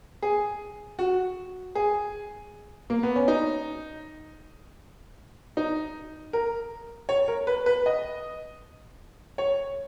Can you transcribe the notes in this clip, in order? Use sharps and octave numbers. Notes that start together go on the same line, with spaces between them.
G#4
F#4
G#4
A#3
B3
C#4
D#4
D#4
A#4
C#5
A#4
B4
B4
D#5
C#5